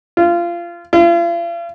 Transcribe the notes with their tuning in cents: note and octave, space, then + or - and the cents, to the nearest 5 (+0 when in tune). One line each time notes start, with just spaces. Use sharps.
F4 -20
F4 -40